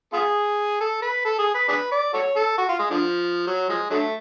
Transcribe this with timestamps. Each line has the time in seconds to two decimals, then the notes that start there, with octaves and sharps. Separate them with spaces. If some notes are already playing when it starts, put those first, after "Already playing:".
0.13 B3 F4 G#4
0.80 A4
1.02 B4
1.25 A4
1.38 G#4
1.54 B4
1.68 D4 G#4 B4
1.91 D5
2.13 F#4 A4 C#5
2.36 A4
2.58 F#4
2.69 F4
2.79 G#3
2.90 D3 F3
3.47 F#3
3.69 F3 G#3
3.90 D3 F#3 A3